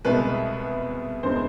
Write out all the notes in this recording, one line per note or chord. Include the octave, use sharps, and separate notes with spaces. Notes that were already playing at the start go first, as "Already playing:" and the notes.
C2 B2 G#3 B3 B4
E2 D3 G#3 B3 C5